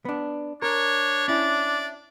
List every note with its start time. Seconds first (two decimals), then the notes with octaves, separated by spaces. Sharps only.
0.05 B3 D4
0.62 D4 A#4 C#5
1.28 C#4 E4 D5